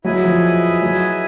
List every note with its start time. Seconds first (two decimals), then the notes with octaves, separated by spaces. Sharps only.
0.04 F#3 E4 G#4 B4 D#5 G#5
0.24 F3
0.82 F#3